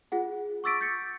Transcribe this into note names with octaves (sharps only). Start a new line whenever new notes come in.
F4 G#4 F#5
C#6 D6 E6 A6 B6 D7
G6 A6 B6 C#7